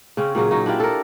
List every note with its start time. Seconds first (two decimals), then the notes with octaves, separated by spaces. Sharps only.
0.17 C#3 C4 C#4
0.35 A#2 C#3 F#3 G#4
0.51 F#3 D#4
0.66 D4 E4 F4 G4
0.80 A4 A#4